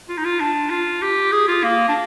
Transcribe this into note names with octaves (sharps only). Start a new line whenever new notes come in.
F4
D#4
F4
D4
F4
G4
G#4
F4
A#3
D4